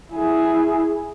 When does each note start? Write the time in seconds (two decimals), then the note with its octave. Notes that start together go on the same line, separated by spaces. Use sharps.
0.12 E4 G#4